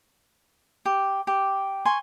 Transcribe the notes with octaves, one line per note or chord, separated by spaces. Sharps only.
G4
G4
G#5 C6 C#6